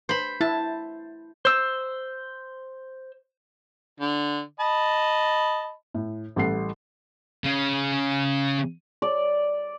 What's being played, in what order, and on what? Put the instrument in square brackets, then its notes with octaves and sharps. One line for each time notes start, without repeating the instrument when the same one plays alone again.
[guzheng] C5 B5
[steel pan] E4 [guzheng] A5
[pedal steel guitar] C5 E6
[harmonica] D3
D#5 A5 B5
[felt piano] A2
A1 G3 A4 F#5 C7
[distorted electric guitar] C#3 C#4
[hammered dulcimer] D5